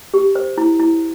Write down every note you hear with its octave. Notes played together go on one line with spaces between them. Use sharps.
G4
C5
E4
E4